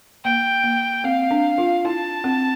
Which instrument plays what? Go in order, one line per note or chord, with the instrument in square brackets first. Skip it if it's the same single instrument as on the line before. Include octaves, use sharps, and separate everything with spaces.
[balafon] A#3 [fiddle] G5
[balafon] A#3
[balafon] C4 [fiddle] F5
[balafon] D4
F4
[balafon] E4 [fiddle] A5
[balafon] C4